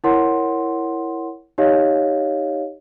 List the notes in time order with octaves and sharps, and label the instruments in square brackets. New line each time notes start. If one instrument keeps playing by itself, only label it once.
[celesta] E4 A#4 C#5 F#5 C6
D#4 G4 C#5 D#5 F5